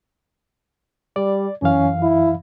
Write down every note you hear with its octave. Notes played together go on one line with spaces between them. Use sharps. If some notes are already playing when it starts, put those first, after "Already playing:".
G3 D5
F#2 E3 C#4 F5
E4